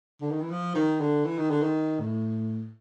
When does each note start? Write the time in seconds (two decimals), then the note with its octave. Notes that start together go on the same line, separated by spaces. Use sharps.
0.21 D3
0.31 D#3
0.41 E3
0.50 F3
0.75 D#3
1.00 D3
1.25 E3
1.38 D#3
1.50 D3
1.62 D#3
2.00 A2